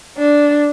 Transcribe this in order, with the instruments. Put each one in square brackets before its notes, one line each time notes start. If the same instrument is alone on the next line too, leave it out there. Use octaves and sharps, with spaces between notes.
[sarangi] D4